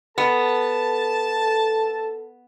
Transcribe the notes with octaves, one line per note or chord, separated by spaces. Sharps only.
B3 A4 A5